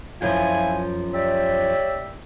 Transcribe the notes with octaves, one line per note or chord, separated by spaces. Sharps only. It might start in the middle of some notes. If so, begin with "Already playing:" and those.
F#2 F3 E4 F4 G#5
G4 C#5 D5 E5